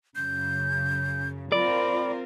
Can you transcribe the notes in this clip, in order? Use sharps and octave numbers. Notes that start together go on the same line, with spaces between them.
F#2 C#3 G6
C4 F4 A#4 D5 B5